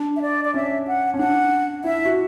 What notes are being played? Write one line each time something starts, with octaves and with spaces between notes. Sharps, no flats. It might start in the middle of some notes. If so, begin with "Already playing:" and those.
Already playing: D4
E5
D5
D5
C#4 E5
F#5
C#4
D4 F#5
E4 E5
F#4